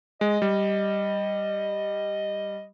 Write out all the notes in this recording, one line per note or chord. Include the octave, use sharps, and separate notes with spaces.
G#3 D#5
G3